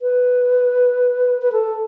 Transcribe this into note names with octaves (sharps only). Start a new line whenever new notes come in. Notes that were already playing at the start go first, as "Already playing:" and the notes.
B4
B4
A4